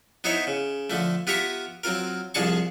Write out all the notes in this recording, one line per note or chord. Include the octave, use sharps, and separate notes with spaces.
B3 D#4 E4 C5 C#5
C#3
D3 F3 A3
B3 F4 G4 E5 A#5 C#6
F#3 C4 F4 A#4
C2 F3 D4 G#4 A5 C#6